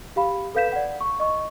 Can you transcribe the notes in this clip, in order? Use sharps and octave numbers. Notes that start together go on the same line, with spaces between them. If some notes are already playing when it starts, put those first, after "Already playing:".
G4 F5 B5
A4 B4 F5 G6 B6 E7
D5 F#5
C#6
D#5 C#6